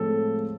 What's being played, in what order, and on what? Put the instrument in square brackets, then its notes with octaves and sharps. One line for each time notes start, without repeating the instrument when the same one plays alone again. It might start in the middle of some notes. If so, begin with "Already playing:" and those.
Already playing: [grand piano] A2 F3 G#3 C4 A4